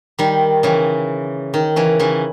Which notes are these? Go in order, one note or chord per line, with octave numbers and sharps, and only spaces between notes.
D#3 G3
C#3 E3
D#3
C#3 E3
C#3 E3